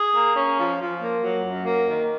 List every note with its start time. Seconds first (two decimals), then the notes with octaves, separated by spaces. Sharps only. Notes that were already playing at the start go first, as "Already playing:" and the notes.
Already playing: G#4
0.15 A#3
0.36 C#4
0.58 F3
0.80 F3
1.01 A#3
1.22 F#3
1.44 F#2
1.65 A#3
1.87 D#3